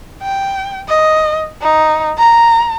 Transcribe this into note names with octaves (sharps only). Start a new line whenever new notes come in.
G5
D#5
D#4
A#5